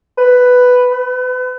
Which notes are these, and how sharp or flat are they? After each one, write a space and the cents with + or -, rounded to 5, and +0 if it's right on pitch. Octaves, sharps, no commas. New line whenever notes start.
B4 +5
B4 +35